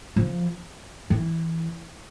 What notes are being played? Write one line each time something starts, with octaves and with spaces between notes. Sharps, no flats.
F3
E3